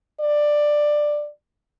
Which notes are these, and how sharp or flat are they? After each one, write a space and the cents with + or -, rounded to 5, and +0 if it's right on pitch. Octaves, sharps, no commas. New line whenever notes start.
D5 +10